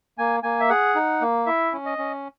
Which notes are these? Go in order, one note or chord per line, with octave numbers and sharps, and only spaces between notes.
A#3 G#5
A#3 G#5
E5
G#4 F#5
D#4
A#3
E4 E5
C#4
D#5
C#4